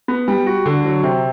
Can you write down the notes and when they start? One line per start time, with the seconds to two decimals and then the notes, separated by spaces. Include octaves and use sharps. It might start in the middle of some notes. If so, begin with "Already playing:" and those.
0.08 B3
0.28 G3
0.46 F#4
0.66 D3
0.85 F#3
1.03 C3